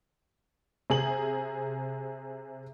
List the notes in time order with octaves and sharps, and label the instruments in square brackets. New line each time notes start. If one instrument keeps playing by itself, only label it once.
[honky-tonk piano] C3 G#4 F#7